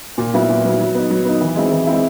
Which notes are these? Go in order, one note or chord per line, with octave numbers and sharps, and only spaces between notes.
A#2
F#3 B3 E4
A#2
F#3 B3 E4
F#3
B3 D#4
F#3
B3 D#4
E3
G#3 C4 E4
E3
G#3 C4 E4